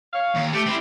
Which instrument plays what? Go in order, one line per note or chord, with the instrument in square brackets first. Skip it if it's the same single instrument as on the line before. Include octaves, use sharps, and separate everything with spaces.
[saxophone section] C#5 F5
[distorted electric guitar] D#2
[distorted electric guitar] A3 [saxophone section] G4
[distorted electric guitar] C4 E4